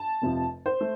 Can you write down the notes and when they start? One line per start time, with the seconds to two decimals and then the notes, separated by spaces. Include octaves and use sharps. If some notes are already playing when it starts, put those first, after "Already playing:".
Already playing: A5
0.22 F1 F2 C3 F3
0.66 C5
0.81 A3